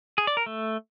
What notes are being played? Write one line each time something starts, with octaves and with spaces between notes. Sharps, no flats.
G#4
D5
A#4
A3